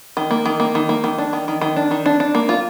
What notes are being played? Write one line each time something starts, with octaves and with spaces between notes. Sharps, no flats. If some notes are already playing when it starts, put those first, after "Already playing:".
D#3
A#3
D#3
A#3
D#3
A#3
D#3
D4
D#3
D#3
D#3
D4
D#3
D4
D4
A#3
F4